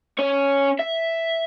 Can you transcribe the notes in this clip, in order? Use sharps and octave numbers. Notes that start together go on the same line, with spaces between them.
C#4 C#5
E5